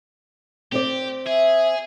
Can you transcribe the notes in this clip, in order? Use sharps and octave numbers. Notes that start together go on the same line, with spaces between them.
C4 G4 C5 D5
G#4 E5